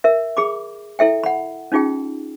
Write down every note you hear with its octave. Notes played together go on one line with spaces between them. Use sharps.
A#4 E5
G#4 B5 D6
E4 A4 E5 G5
F#5 B5
C#4 D#4 F4 G#4 G5